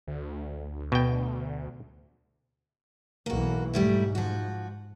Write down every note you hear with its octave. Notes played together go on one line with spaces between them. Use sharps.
D2
B2 G5
B1 B2 E3 A#3 F#4
G#2 G3 A3 E4
F3 F#4